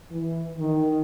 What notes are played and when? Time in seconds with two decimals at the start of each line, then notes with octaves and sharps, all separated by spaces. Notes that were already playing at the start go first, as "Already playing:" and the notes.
0.10 E3
0.59 D#3